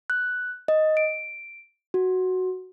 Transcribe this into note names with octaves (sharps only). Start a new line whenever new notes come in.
F#6
D#5
D7
F#4